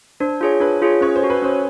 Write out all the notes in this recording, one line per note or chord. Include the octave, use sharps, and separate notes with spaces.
D4 C5
F4 G#4 C#5
D4 B4
F4 G#4 C#5
C#4 C#5
C5
F#4 A4
B4
C#4 C5